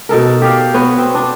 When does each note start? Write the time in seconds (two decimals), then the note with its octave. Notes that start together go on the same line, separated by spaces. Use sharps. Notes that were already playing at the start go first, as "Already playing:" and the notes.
0.09 B2 D#4 A4 A#4
0.42 G4 D5 F5
0.74 B3 F#4 C#5
0.98 C4
1.15 D4